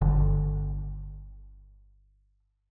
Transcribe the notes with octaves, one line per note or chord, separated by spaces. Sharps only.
G1 D3